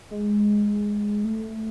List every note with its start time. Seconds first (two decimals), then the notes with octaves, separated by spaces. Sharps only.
0.11 G#3
1.25 A3